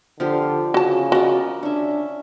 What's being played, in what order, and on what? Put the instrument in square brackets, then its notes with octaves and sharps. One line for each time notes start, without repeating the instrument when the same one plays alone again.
[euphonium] D3 [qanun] F3 F4 G4
[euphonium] C#3 [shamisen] F#4 A5
[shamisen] F#4 [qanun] A#4 D5 D#5
[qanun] C#4 E5 [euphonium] D4